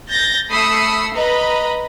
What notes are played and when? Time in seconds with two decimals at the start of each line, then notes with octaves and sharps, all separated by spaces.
0.10 G6 A6 A#6
0.50 A3 B5 D#6 E6 C7 C#7
1.13 B4 D#5 A#5 B5